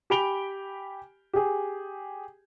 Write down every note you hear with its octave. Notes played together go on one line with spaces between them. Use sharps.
G4 G#5 B5 D7 F7 G7
G4 G#4